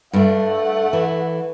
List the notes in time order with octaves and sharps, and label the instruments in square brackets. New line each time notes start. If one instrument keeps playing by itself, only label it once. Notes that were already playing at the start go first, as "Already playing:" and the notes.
[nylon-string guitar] G2 D4 [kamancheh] A3 F#5
[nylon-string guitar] E3